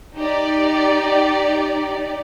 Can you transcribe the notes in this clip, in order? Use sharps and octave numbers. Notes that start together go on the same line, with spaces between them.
D#4 G4 D5